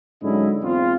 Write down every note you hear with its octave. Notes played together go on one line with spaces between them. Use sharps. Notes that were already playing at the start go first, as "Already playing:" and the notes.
G#2 D3 F#3 C#4 E4 D#5
E2 C4 F4